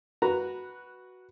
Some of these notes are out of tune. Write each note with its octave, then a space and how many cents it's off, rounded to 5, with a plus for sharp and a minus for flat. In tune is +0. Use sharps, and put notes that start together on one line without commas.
F#4 +0 B4 -10 A#5 +0